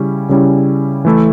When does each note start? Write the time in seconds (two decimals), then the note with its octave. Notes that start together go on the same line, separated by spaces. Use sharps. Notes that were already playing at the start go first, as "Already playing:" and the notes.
Already playing: C#3 G3 C#4 E4
0.29 C#3 G3 C#4 E4
1.05 E3 A3 E4 A4